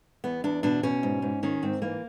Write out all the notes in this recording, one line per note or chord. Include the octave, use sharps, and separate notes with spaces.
E2 B3
E2 D4
B2 D4
B2 C#4
G#2
G#2
D#3 C#4
G#2 C4
E3 A#3